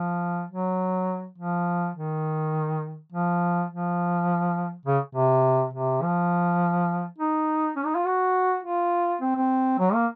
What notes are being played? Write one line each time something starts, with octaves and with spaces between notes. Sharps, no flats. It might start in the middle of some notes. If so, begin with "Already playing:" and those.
Already playing: F3
F#3
F3
D#3
F3
F3
C#3
C3
C3
F3
D#4
C#4
D#4
F4
F#4
F4
C4
C4
F#3
A#3